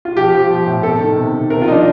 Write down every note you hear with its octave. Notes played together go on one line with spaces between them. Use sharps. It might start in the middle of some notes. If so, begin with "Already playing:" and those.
F4
F3 G4
F3
F3
A2
C3 A4
D#3
C3
D#3
C3 A#4
F4
F3 D4 D#4